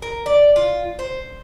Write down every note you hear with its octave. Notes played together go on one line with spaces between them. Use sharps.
A#4
D5
F4
C5